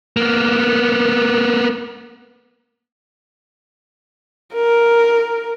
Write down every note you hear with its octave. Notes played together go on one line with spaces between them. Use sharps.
A#3 B3
A#4